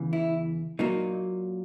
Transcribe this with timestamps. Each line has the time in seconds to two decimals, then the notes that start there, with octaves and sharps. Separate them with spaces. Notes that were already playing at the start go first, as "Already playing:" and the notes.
Already playing: E2 C#3 E3
0.13 E4
0.79 A#2 F#3 A#3 D#4